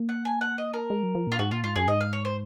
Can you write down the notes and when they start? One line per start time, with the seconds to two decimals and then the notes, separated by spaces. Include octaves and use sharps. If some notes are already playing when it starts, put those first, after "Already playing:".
Already playing: A#3
0.09 F#5
0.25 G#5
0.41 F#5
0.58 D#5
0.74 A#4
0.90 G#3
1.03 F#3
1.15 F3
1.27 A#2 F4
1.39 G#2 F#4
1.51 A#2 F4
1.64 G#2 F4
1.76 F#2 G#4
1.88 G#2 D#5
2.01 F5
2.13 C#5
2.25 C5